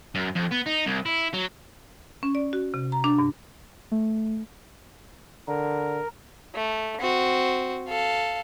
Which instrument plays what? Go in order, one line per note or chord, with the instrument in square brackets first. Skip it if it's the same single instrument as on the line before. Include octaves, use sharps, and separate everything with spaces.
[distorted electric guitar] F#2
F2
B3
D#4
C2
E4
F#3
[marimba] C#4
D5
F#4
C3
A#5
D4
G2
[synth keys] A3
[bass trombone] D3 [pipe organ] A#4
[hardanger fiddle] A3
C4 F#4
A4 F5